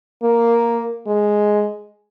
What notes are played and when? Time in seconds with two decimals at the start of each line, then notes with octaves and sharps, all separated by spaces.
0.23 A#3
1.07 G#3